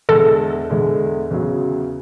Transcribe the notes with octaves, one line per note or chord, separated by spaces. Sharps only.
E2 D3 G#3 A4
E2 D3 G#3
E2 C#3 F#3